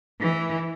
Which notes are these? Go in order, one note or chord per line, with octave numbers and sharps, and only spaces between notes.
E3